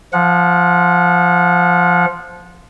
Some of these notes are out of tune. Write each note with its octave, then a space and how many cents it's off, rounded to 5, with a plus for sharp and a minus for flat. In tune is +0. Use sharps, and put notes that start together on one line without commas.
F3 -5 F#5 -30